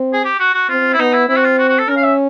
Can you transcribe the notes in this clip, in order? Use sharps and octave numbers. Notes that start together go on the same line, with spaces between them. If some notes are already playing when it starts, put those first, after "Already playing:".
Already playing: C4
G#4
G4
F#4
F#4
C4 F4
E4
B3 D#4
E4
C4 E4
F#4
F4
F#4
F#4
A4
C#4 A#4
F5
E5